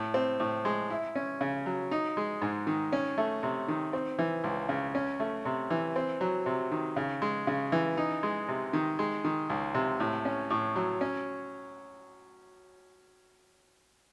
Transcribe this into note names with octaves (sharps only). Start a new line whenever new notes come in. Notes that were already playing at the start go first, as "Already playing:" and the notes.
Already playing: A2
C4
A2
G#3
E4
C#4
C#3
F#3
D#4
G#3
G#2
D#3
C#4
A3
C3
D#3
C4
E3
C#2
C#3
C#4
A3
C3
E3
C4
F#3
C3
D#3
C#3
G#3
C#3
E3
D#4
G#3
C3
D#3
G#3
D#3
C#2
C3
A2
C#4
A2
F#3
C#4